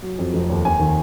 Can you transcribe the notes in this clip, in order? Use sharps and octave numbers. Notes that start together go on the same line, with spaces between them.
F#3
F2
F1
D#2
D#2 G#5
D#3